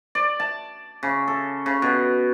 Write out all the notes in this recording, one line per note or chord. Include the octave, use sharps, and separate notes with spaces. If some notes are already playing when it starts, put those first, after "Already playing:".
D5
A5
C#3
A4
C#3
B2